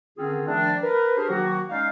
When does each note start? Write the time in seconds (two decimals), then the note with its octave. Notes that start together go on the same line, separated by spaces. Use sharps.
0.17 D3 D#3 C4 C#4 F4 G#4
0.47 D#3 F3 G3 A3 D4
0.82 A#4 B4
1.17 D4 G4 G#4 A#4 C5
1.28 D#3 F#3 A#3 F#4
1.70 G#3 C#4 D#4 D5 F5